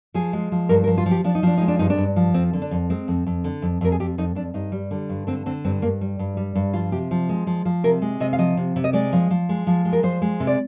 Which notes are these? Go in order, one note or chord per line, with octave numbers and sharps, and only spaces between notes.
F3 G#4
G#3
F3
G2 A#4
A#4
F3
F4
F3
G4
F3 D4
D#4
F3 D4
G#3 D#4
D4
G2 D#4
D4
G2
F3
F2 C4
D3
D4
F2
G#3 C4
F2
F2
D3
F2
F2 A#4
G#4
F2 G4
F2 D#4
F2 D4
G2 D#4
G3
D3
G2
D3 C4
D3 C4
G2 C4
G2 A#3
G3
G2
G3
G2
F3 F4
C3 G4
F3
G#3
F3
F3
C3 A#4
G#3
C3 D#5
F5
F3 D#5
C3
C3
D#5
G#3 D5
F3
F3
G#3
F3
G#3
A#4
F3 C5
G#3
C3
D5